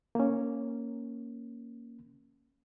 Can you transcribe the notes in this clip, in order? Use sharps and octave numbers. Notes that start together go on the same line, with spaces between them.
A#3 C#4